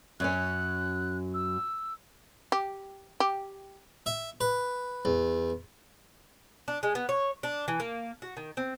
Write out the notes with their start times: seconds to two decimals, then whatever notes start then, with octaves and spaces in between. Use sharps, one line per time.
0.20 F#2 F#3 C#4 F#6
1.34 E6
2.52 G4
3.20 G4
4.06 E5
4.41 B4
5.05 E2
6.68 D4
6.83 G#3
6.95 B3
7.09 C#5
7.43 D4
7.68 E3
7.80 A#3
8.22 F#4
8.37 D#3
8.57 C4